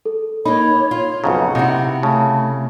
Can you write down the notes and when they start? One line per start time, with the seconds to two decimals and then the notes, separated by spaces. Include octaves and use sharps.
0.05 A4
0.45 A#3 D#4 C#5 B5
0.91 F4
1.24 B1 F2 C#3 F#5 A#5
1.55 C3 D#4 E4
2.03 C#3 A3 A5